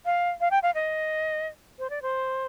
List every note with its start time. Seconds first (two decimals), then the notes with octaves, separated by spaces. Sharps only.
0.05 F5
0.41 F5
0.51 G5
0.63 F5
0.75 D#5
1.79 C5
1.90 D5
2.02 C5